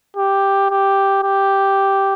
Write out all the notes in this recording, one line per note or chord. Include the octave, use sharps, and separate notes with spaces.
G4
G4
G4